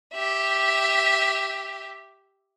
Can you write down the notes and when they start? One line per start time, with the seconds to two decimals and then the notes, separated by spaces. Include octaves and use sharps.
0.13 G4 E5